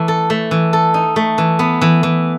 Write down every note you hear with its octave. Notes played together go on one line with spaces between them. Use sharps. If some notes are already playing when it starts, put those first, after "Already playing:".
Already playing: E3 A3
A4
A3
E3
A4
D#4
A3
E3
B3
E3
E3